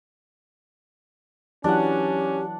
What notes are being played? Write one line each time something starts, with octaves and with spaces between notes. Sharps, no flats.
E3 F#3 C#4 D4 E4 G4 F#5